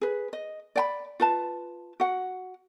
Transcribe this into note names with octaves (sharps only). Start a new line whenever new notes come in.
G#4 B4
D#5
D5 G5 B5
F4 B4 A5
F#4 F#5